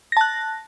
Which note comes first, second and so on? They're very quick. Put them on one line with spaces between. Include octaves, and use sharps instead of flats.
A#6 A5 F#6